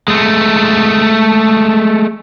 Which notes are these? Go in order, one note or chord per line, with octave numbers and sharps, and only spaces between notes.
G#3 A3